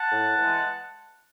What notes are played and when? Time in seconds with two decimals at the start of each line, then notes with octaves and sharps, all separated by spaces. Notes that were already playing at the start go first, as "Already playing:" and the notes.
Already playing: F#5 A5
0.11 A2
0.37 E3 G#3